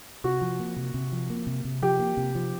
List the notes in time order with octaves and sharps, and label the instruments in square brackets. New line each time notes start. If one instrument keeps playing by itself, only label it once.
[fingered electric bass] C3 [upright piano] F#4
[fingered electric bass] F3
A#3
C3
C3
F3
A#3
C3
C3
[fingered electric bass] F3 [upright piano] G4
[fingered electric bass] A#3
C3
F3